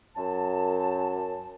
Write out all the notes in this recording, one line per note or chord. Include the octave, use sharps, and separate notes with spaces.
F#2 A5